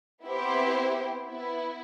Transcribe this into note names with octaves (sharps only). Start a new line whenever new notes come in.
B3 C4 E4 G4 C5
B3 E4